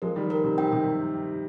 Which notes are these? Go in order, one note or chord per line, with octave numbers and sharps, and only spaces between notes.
F3 G#3 A#4
D#3 G3
A#4
C3 D#3
C3 D#3 G5
C3 D#3